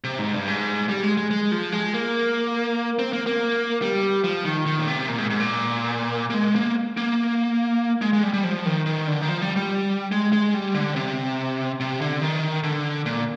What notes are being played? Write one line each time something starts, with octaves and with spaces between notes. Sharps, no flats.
C3
G#2
G2
G#2
G3
G#3
G#3
G#3
F3
G#3
A#3
C4
A#3
A#3
G3
F3
D#3
D#3
A#2
C3
A#2
G#2
G#2
A#2
A#3
G#3
A#3
A#3
G#3
G#3
G3
G3
F3
D#3
D#3
D3
D#3
F3
G3
G3
G#3
G#3
G3
D3
C3
C3
D3
D#3
D3
A#2